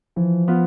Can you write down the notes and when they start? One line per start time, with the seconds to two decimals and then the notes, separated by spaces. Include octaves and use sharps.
0.16 E3 F3
0.48 B3 F4